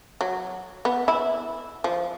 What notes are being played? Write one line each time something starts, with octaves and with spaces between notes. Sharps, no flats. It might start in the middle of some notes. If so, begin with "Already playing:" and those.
F#3
B3
E4
F3